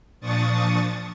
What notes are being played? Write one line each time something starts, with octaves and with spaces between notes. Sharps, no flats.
A#2 F3 D4 C#6 D#6 A6